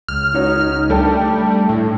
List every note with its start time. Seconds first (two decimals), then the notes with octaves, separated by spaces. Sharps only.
0.08 C#2 F6
0.34 C#4 D#4 F#4
0.90 G3 A3 D4 A4 G5
1.69 A2